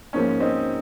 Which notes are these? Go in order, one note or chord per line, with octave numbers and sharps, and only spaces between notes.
G#2 F3 A#3 C#4
C4 D#4